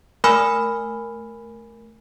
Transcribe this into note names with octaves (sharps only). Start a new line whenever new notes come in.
A3 A#4 G#5 B5 E6 F6